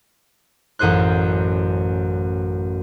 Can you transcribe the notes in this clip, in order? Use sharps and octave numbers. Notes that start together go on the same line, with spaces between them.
A1 F#2 G#4 C5 F#6